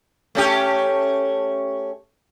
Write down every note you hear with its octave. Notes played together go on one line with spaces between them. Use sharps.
A3 C#4 G4